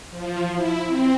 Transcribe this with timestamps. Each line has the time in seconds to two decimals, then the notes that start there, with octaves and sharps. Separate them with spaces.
0.10 F3
0.54 E4
0.86 C4